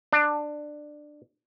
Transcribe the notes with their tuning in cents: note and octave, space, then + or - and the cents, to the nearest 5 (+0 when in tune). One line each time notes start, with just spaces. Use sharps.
D4 +15